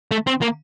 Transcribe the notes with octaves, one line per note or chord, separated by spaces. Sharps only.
A3
C4
A#3